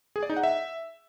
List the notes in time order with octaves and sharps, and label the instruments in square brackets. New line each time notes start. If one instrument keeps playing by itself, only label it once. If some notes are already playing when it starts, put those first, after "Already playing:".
[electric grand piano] G#4
D5
D#4
F#5
E5